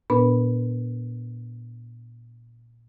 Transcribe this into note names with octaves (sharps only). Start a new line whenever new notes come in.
A#2 B3 D4 B4 B5